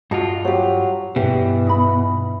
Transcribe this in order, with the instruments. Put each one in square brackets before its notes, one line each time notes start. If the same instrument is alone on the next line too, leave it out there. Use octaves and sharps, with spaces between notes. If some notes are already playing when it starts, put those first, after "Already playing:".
[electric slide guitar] G2 F4 [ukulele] F#4 D#5 A5
[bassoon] F#3 [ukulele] G4 C5
[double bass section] G2 [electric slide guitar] B2 [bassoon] E3 [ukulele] G4
[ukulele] D#4 B5